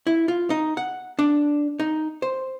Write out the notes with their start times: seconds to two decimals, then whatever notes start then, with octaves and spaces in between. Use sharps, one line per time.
0.07 E4
0.28 F4
0.50 D#4
0.77 F#5
1.19 D4
1.80 D#4
2.22 C5